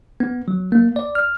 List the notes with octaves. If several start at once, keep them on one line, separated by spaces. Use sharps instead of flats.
B3
F#3
A#3
D5
F6